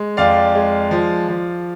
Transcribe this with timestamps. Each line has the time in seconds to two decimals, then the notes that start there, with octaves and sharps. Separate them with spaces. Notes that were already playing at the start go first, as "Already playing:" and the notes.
Already playing: G#3
0.17 F2 D5 F5
0.55 G#3
0.91 F3
1.28 F3